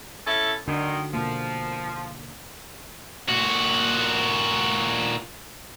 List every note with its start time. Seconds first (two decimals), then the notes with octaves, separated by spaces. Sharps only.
0.27 C#4 E4 A4
0.68 F#2 D3 D#3 D4 F#4
1.14 B2 F3 A#3
3.29 A#2 F#4